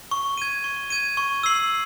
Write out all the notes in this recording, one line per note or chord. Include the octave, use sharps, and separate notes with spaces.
C#6
G#6 D#7
C#6
G#6 D#7
C#6
E6 C7 F#7